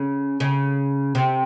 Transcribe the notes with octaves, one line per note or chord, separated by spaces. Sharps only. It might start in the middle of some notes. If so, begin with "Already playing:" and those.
Already playing: C#3
C#3
C3